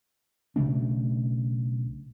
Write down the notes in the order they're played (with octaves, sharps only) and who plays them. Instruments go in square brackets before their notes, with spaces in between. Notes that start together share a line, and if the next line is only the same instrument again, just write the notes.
[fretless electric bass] B1 C#3 A3 D4